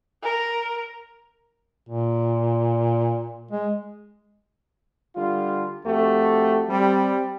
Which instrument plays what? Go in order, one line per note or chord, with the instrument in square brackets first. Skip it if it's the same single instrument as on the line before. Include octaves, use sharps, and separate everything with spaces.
[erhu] A#4
[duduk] A#2
G#3
[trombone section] D3 G3 F4
F2 A3 F#4 G4
G3 C4